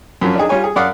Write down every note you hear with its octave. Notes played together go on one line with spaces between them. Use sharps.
F#2 F3 F#3 C#4
D4 D#4 G#4
G3 F4 C#5 G#5
G#4
F#2 D5 F5 F#5 D#6